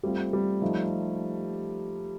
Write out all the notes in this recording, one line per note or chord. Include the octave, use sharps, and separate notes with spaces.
G3 A3 C4 F4
G3
F3 A3 D#4